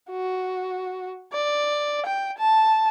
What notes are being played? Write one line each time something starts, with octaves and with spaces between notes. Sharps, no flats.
F#4
D5
G5
A5